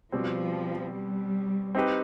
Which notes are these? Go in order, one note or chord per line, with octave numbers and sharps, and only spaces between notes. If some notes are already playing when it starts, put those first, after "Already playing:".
B2 F3 G3 C4
G3
C4 D#4 G4 B4